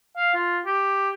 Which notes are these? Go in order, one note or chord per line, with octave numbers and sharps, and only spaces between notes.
F5
F4
G4